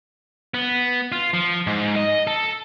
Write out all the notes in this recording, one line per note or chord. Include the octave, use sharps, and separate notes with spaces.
B3
F4
F3
G#2
D#5
A4